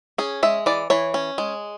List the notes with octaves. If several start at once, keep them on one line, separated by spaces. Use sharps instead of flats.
C#4 G#4
G#3 E5
E3 D5
E3 C#5
C#4
G#3